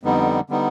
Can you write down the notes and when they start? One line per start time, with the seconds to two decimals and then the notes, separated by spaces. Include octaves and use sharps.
0.03 F2 D3 G3 B3 D#4
0.50 D3 G3 B3 D#4